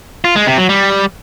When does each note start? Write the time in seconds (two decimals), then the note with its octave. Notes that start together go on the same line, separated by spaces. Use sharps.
0.24 F4
0.36 G#3
0.47 C3
0.58 F#3
0.69 G3